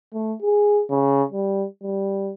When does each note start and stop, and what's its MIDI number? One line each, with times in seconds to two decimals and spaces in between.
0.13 0.34 57
0.42 0.82 68
0.91 1.23 49
1.32 1.66 55
1.83 2.32 55